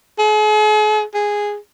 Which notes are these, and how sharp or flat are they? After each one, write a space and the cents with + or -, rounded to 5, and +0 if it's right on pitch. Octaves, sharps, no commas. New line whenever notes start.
G#4 +40
G#4 -5